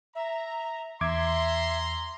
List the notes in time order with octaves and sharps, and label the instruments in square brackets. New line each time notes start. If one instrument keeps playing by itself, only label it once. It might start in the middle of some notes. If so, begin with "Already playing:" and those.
[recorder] E5 [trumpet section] A#5
[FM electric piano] E2 D6 G#6 [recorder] E5 [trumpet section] A#5 C6